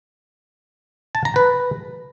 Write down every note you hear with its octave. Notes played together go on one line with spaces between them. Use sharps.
A5
A#5
B4